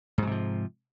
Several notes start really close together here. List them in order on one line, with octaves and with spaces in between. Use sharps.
G#2 F#3 C3 F3